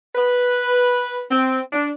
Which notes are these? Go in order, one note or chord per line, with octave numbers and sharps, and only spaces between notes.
B4
C4
D4